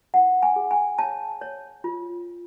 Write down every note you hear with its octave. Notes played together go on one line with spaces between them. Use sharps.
E4 F#5
G#5
G#4
G#5
C#5 A5
C#5
F4